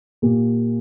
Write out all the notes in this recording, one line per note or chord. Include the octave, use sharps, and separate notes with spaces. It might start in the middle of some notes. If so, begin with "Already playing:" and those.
A#2 A#3 G4